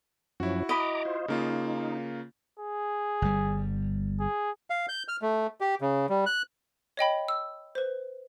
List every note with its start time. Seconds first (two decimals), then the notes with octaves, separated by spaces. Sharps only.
0.40 F#2 F3 C#4 E4 F#4
0.69 D#5 A#5 B5 D6
1.05 F4 C5
1.28 C#3 A#3 D#4 F4
2.59 G#4
3.22 G1 G3
4.20 G#4
4.70 F5
4.89 G6
5.08 F6
5.22 A3
5.61 G4
5.81 C#3
6.09 G3
6.26 F#6
6.97 C#5 D#5 G5 B5
7.28 E6
7.75 B4 C5